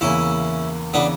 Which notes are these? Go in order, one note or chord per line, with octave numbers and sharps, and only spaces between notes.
E2 C#3 E3 A#3 C#4 E4
C#3 E3 B3 D4